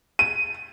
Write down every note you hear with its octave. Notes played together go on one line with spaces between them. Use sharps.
D#7